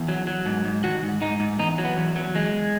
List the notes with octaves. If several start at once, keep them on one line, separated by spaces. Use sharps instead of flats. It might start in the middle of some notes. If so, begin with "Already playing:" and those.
Already playing: E2
F#3
F#3
G#2
G#2
D#3 F#4
G#2
G#2 D#4
G#2
E2 D#4
F#3
B3
E2
F#3
E2 G#3